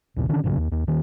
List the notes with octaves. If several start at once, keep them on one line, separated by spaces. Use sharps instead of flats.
A#1 D#2 B2
D3 D#3 C#4 D4
A1 F#2 C#3 F#3
D#2
D#2
D#1 D#3